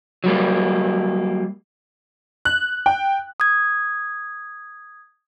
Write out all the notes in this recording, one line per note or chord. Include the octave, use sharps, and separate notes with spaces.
F#3 G3 A#3
F#6
G5
D#6 G#6